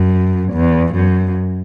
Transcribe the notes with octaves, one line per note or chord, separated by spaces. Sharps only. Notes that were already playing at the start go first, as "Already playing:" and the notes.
Already playing: F#2
E2
F#2